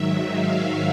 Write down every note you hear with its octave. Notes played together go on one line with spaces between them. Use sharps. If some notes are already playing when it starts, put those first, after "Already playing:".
Already playing: G#2 D#3 F#3 E5
F5